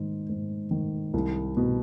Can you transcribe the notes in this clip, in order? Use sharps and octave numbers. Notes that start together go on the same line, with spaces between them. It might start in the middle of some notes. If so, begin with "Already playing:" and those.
Already playing: G#2 D#3
G#2
D#3
C2
B2